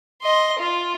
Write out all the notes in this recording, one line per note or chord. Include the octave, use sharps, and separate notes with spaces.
D#5 C6
F4